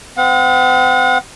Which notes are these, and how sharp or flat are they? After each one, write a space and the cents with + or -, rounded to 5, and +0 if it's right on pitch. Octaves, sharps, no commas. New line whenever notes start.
C4 -40 F#5 -45